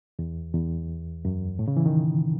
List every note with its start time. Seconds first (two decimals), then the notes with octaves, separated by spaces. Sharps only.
0.19 E2
0.54 E2
1.25 F#2
1.59 A2
1.68 C#3
1.77 E3
1.86 D#3